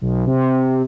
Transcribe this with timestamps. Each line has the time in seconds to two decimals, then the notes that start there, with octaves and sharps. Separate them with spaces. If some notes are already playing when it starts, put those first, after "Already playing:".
0.01 B1
0.26 C3